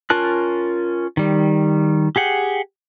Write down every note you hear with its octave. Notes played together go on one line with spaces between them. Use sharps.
C#4 F4 A#4 A5 F#6
D#3 G3
G4 G#4 F#5 G5